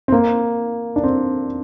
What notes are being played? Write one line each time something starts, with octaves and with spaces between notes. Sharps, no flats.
C4
A#3
D4
C4